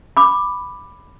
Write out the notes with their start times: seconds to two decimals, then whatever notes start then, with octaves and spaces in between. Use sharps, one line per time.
0.17 B5 D6